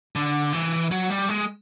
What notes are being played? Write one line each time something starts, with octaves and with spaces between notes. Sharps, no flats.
D3
E3
F#3
G3
G#3